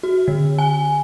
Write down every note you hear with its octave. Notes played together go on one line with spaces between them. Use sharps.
F#4
D3
G#5